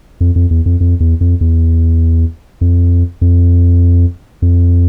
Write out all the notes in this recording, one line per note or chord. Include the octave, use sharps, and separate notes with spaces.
F2
F2
E2
F2
F2
E2
F2
E2
F2
F2
F2